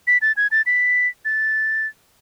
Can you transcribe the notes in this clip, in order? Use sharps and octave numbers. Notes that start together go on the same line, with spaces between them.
B6
A6
G#6
A6
B6
A6